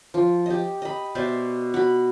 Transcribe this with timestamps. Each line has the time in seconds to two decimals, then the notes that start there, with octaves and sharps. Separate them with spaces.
0.14 F3
0.46 G4 D#5
0.82 D#5 B5
1.15 B2 C5 D5 E5
1.74 F#4 B5